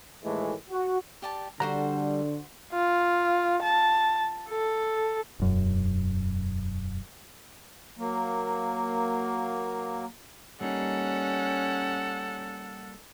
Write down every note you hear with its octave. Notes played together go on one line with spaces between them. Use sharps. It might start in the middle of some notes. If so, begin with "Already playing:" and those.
D#2 A2 E3 G#3 A3
F#4
G4 D5 A5
D3 G3 F#4 C5 D5 F#5 A#5
F4
A5
A4
E1 F#2
F#3 A#3
G3 A#3 C#4 D#4 A4 F#5